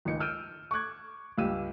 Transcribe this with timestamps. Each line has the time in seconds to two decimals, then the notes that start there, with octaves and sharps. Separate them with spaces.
0.05 G#1 C#2 D#4 C#7
0.20 E6 F6 G6 D7 D#7
0.71 C#6 D6 F#6 G#6
1.38 C#2 G2 G4 F5 E6 D#7